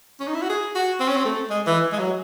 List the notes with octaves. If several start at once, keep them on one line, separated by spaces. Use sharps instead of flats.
C#4
D#4
E4
F#4
G#4
F#4
C4
C#4
C4
A3
G#3
E3
G#3
F#3